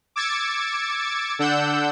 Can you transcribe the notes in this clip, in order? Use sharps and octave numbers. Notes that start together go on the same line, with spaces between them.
D6 E6 G#6 A6 C#7
D3 D4 F#5 E6 G6